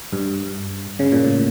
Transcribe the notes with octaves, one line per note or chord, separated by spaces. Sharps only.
G2
C#3
A#2
A2